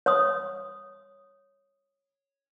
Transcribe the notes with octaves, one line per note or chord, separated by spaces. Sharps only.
C#5 C6 D#6